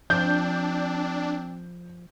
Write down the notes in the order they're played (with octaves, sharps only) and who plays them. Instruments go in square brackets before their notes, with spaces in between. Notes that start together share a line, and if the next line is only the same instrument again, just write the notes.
[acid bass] F3 [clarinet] C4 [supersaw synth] D4 [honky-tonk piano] G6